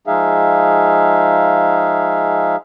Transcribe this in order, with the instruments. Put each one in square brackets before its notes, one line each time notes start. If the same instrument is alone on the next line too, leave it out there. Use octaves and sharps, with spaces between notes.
[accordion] F3 G#3 D#4 G#4 E5 F5